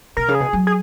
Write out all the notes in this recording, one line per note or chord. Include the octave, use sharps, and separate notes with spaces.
B2 A#4
C#3
G#4
B2
F#3
G#4